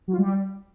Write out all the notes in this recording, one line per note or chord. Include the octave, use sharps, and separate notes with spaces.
F#3
F4
G3